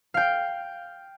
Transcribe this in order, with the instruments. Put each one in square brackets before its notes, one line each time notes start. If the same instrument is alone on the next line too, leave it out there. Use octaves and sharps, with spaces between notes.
[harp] F5 G5